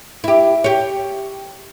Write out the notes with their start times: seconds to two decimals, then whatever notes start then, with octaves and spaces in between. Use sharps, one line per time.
0.24 E4 G4
0.64 G4 C#5